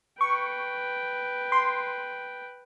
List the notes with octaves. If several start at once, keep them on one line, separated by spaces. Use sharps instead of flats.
B4 G5 C#6
C6